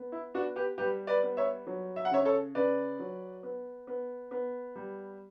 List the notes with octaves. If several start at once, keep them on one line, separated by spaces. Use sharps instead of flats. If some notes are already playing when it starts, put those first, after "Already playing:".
Already playing: B3
E4
B3 D4 F#4
G4 B4
G3 G4 B4
B4 D5
B3
C#5 E5
F#3
E5
F#5
C#3 C#5 E5
A4 C#5
C#3 B4 D5
F#3
B3
B3
B3
G3